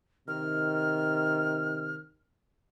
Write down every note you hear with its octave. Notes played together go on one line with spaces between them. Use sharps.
C3 D#3 F6